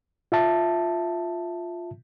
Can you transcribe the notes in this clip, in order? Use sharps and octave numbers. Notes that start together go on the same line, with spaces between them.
F4 E5 A5